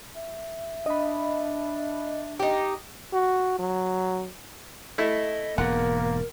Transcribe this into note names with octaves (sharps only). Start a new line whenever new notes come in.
E5
D4 D#5 B5
D#4 G4
F#4
F#3
A3 E4 D#5
E1 G#2 A#3 A#4 F#5